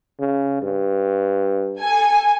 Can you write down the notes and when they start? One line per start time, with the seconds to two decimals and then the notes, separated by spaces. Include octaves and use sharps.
0.20 C#3
0.62 G2
1.78 A4 G#5